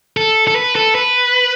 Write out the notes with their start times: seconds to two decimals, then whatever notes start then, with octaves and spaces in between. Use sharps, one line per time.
0.17 A4
0.47 A4
0.56 B4
0.75 A4
0.95 B4